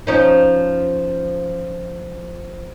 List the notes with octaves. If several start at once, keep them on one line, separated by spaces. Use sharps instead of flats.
F3 C#4 D#4